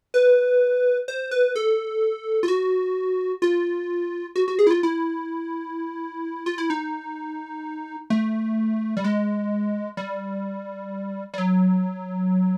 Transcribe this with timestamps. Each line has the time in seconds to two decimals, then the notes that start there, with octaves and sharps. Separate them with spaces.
0.14 B4
1.08 C5
1.31 B4
1.55 A4
2.43 F4
2.48 F#4
3.42 F4
4.36 F#4
4.48 F#4
4.59 G#4
4.67 E4
4.71 F4
4.83 E4
6.46 F4
6.58 E4
6.70 D#4
8.10 A3
8.97 G3
9.04 G#3
9.97 G3
11.34 G3
11.38 F#3